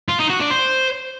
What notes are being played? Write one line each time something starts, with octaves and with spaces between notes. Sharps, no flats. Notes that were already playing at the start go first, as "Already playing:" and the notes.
F4
D#4
F#4
D4
C5